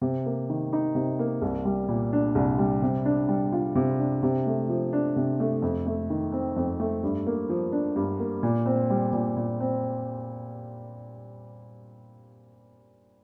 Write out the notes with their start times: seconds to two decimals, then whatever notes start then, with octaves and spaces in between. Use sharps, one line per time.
0.02 C3
0.26 A#3
0.49 D#3
0.73 D#4
0.95 C3
1.19 A#3
1.42 C2
1.65 G3
1.88 A#2
2.13 D4
2.35 C2
2.58 G3
2.82 C3
3.05 D4
3.29 G3
3.52 F4
3.75 C3
3.99 D4
4.23 C3
4.46 A3
4.69 F3
4.93 D4
5.16 C3
5.40 A3
5.62 F2
5.86 A3
6.10 D#3
6.32 C4
6.56 F2
6.80 A3
7.03 G2
7.27 A#3
7.49 F3
7.72 D4
7.96 G2
8.20 A#3
8.43 A#2
8.66 C4
8.90 G3
9.13 A#2
9.37 A#2
9.60 C4